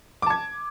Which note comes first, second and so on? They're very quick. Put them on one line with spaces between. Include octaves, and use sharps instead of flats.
D6 A5 G#6